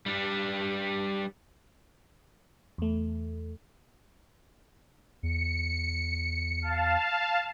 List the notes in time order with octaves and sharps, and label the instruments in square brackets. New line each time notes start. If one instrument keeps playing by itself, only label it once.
[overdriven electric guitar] G3 D4
[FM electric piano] E2 A3
[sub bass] E2 [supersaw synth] C#7
[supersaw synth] F5 A5